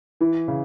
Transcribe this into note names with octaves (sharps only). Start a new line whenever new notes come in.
E3 E4
C#3